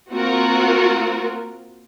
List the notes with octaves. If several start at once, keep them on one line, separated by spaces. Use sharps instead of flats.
A#3 C4 F4 F#4 A#4